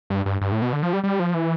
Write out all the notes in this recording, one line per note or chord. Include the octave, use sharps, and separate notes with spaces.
G2
G2
G2
A2
B2
D3
F3
G3
G3
F3
E3